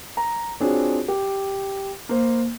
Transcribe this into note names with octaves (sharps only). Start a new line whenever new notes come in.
A#5
C4 D4 F4 F#4 G#4 C#5
G4
A#3 C5